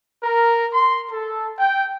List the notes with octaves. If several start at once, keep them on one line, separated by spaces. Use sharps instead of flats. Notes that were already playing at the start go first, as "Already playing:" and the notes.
A#4
C6
A4
G5